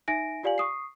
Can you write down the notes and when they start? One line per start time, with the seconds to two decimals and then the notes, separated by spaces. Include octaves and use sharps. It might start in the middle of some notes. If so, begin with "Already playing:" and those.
0.08 D#4 E5 G#5 A#6 D7
0.43 F4 G4 D5 F5 G#5 F#7
0.58 C#6 D#6 C7